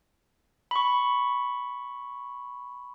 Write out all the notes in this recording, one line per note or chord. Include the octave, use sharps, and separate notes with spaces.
B5 C#6